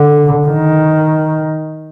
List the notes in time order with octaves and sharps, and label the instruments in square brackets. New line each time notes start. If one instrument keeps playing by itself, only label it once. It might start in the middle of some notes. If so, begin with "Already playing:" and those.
Already playing: [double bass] D3
D#3